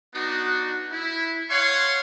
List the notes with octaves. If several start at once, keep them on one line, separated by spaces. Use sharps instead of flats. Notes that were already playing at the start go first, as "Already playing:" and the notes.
B3 D4 D#4 F#4
E4
C#5 F5 F#5 G#5 C6 C#6